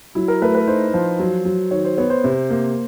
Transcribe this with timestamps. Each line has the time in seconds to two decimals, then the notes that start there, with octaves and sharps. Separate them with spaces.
0.15 F#3 E4
0.28 A#4
0.42 A3 B4
0.55 B4
0.67 D#4 C5
0.93 F3 C5
1.19 F#3
1.45 F#3
1.71 D#3 C#5
1.85 C5
1.98 B3 C#5
2.10 C5
2.24 C3
2.50 A#3